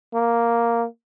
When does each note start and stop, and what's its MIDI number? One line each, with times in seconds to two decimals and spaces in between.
0.14 0.86 58